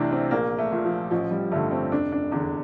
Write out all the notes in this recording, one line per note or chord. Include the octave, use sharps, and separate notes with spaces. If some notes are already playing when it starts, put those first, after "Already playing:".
Already playing: C2 C3 E3 A3 C4 D4
C4
A#1 A#3
A3
A#2
F3
A1 F3
G3
G2 D3 A3
C4
F1 D4
D4
E2 D3 D4